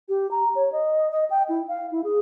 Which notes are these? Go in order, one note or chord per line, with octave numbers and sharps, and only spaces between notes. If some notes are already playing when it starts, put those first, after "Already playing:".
G4
A#5
C#5
D#5
D#5
G5
E4
F5
E4
G#4